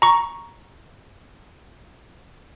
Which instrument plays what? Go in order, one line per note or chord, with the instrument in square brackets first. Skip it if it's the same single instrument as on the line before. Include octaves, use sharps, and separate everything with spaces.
[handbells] A#5 C#6